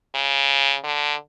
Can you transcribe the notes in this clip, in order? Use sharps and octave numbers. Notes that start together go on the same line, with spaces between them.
C#3
D3